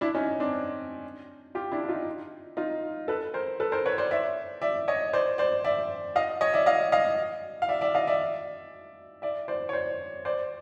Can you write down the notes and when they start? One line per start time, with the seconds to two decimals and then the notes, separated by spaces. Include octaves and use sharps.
0.01 D4 E4
0.15 C#4 D#4
0.40 C4 D4
1.55 F4 G4
1.72 D4 E4
1.89 D#4 F4
2.57 D#4 F4
3.08 A4 B4
3.34 A#4 C5
3.60 A4 B4
3.72 A#4 C5
3.86 B4 C#5
3.98 C5 D5
4.11 D5 E5
4.62 D5 E5
4.88 C#5 D#5
5.13 C5 D5
5.38 C5 D5
5.64 D5 E5
6.16 D#5 F5
6.41 C#5 D#5
6.53 D5 E5
6.66 D#5 F5
6.92 D#5 F5
7.62 F5
7.68 D5 E5
7.81 D5 E5
7.95 D#5 F5
8.07 D5 E5
9.22 D5 E5
9.48 C5 D5
9.69 C#5
9.73 C5 D5
10.25 C5 D5